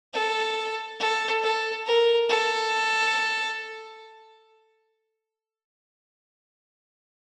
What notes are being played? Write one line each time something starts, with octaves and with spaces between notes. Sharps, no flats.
A4
A4
A4
A#4
A4